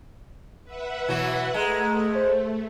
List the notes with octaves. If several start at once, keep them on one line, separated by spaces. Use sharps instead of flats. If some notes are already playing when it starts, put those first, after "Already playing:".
B4 E5 F#5
B2 E3 F#3 F#4
G#3 A3 A#5
C5